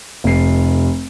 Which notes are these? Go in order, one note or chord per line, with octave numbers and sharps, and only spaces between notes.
F1 C7